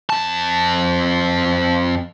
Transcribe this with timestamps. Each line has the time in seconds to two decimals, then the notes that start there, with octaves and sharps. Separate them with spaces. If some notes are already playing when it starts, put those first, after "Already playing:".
0.10 F2 A5